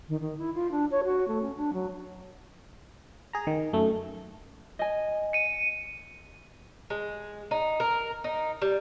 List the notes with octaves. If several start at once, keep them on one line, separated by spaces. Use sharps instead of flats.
D#3
D#3
E4
F4
D4
C#5
F#4
A3
C#4
D4
F#3
G#4 A#5
D#3
F#2 A3
D#5 G#5
C#7 D#7
G#3
D#4
A#4
D#4
G3